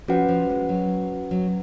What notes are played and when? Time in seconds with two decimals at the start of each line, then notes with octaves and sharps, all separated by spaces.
0.08 F3 C#4 F#4 B4 F#5
0.28 F3
0.49 G#3
0.69 F#3
1.31 F#3